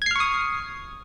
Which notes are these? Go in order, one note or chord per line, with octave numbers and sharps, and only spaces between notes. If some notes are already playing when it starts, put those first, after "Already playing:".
C#6 D#6 F6 G#6 C7